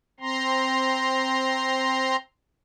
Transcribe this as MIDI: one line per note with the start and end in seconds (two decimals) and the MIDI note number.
0.20 2.16 60
0.20 2.16 82
0.20 2.16 84